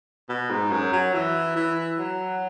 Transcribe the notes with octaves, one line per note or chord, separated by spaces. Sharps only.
B2
G#2
F#2
F#3
E3
E3
F#3